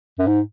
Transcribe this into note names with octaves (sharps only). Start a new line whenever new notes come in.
F#2
G#2